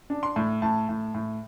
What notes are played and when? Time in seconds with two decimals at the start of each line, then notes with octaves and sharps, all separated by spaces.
0.10 D4
0.23 C6
0.36 A2
0.62 A2 A5
0.89 A2
1.14 A2